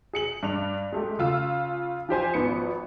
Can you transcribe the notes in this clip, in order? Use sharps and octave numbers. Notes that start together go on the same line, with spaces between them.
G#4 C#7 F#7
G2 D5 F7
G#3 A3 G4
C#3 F4 E6
F3 G4 C5 G#5
G#1 F3 B3 C#7